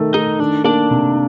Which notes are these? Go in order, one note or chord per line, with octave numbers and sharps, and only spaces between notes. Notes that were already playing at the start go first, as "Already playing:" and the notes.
Already playing: D#3 A3
A3 D#4
D#3 D4
A#3 D4
C3